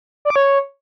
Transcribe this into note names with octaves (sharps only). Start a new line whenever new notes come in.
D5
D6
C#5